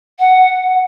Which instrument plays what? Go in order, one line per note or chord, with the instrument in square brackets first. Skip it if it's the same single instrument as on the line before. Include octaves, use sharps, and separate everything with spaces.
[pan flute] F#5